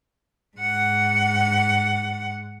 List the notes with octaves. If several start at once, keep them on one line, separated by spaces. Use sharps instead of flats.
G#2 F#5